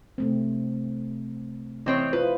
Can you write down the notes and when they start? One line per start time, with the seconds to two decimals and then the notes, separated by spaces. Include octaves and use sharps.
0.18 C3 A3 C4
1.86 E3 C4 C#5 D#5
2.13 E4 F4 B4 C5